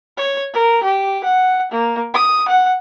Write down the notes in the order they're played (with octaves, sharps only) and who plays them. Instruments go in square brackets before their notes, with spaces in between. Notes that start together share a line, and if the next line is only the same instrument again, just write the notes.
[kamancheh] C#5
A#4
G4
F#5
A#3
D#6
F#5